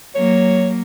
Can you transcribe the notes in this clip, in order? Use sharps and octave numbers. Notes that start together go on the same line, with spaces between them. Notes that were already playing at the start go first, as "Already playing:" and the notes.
F#3 A#3 C#5